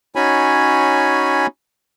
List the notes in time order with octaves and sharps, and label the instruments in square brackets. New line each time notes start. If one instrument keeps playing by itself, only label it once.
[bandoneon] C#4 D#4 F#4 C#5 G#5 B5